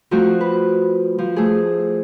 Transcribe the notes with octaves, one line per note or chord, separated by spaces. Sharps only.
F3 A3 C4 F#4
B4
F3
A3 G#4